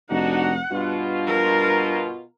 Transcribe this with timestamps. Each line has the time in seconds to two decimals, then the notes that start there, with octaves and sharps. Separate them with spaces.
0.10 F1 D4 D#4 F#4 F#5
0.71 G2 B2 F4
1.27 A#4